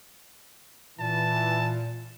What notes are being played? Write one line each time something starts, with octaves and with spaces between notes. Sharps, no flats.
A#2 E3 A5